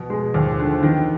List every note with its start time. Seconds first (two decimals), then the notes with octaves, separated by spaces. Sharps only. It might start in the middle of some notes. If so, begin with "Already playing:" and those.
Already playing: B2 F3
0.10 G#3
0.34 D#2 F3
0.50 F3
0.59 D3
0.66 F3
0.83 D#3 E3